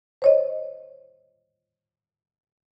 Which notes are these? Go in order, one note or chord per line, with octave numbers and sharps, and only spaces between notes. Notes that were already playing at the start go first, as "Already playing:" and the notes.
C5 C#5 D#5